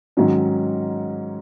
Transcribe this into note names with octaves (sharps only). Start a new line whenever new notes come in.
G#2 D#3 F#3 C#4